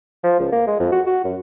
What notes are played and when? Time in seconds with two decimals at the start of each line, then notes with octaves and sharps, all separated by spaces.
0.24 F3
0.39 C#2
0.52 A#3
0.67 G#3
0.80 F2
0.92 F#4
1.06 F#4
1.25 F#2